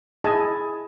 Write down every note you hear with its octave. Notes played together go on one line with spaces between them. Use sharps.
E4 G#4 D#5 G#5 A5